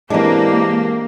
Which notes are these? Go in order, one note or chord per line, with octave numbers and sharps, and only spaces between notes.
E3 G#3 A#3 C4 D4 G4